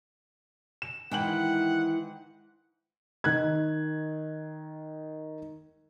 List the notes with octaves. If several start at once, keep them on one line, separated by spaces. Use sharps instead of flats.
E7
G#2 D#3 E3 E4 F#5 G5 F#7
D#3 F#6 G#6